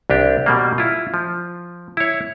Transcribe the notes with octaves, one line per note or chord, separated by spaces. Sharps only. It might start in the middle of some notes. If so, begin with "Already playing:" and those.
C2 D4 G4
B2 G3 A#3
E4 F4
F3
E4 C#5